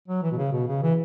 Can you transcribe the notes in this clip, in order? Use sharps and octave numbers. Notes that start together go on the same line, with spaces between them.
F#3
E3
B2
C#3
B2
C#3
E3